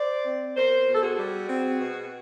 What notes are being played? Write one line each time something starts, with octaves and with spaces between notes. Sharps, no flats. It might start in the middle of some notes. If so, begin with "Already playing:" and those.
Already playing: C5 D5
C4
B2 A#4 C5
B2
A4
F#4 G#4
G3
C4
B2